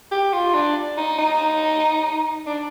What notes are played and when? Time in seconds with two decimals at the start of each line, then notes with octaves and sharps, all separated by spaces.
0.11 G4
0.33 F4
0.54 D4
0.98 D#4
1.19 D#4
2.47 D4